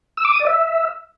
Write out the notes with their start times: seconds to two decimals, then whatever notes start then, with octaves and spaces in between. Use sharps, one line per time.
0.17 E6
0.25 D6
0.32 D#6
0.39 D5
0.47 E5